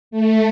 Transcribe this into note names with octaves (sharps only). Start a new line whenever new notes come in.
A3